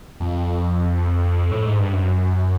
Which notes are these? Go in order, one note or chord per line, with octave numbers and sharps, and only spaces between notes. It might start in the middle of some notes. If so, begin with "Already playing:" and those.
F2
A2
G#2
G2
F#2